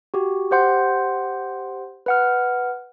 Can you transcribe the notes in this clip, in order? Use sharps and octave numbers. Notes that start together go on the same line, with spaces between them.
F#4 G4
G4 C5 F#5 C6 G6
B4 F#5 F6